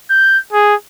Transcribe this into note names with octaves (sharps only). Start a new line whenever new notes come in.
G6
G#4